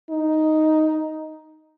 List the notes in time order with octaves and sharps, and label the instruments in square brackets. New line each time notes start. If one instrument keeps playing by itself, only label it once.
[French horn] D#4